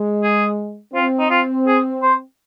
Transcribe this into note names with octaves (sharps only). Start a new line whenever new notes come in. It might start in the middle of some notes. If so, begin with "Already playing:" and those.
Already playing: G#3
G#4
C4 F4
D#4
F4
G#4
C5